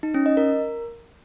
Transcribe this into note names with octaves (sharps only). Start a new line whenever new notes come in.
D#4
C#4
D#5
A#4